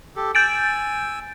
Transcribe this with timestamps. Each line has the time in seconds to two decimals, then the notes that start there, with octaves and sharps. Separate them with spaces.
0.16 G4 A4
0.35 G#5 E6 G6 A6 D7